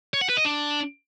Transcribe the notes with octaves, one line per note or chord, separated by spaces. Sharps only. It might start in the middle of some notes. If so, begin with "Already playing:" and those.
C#5
F#5
B4
D#5
D4